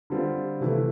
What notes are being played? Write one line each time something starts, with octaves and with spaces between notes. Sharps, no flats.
D3 G3 C4 F4
C3 E3 A3 E4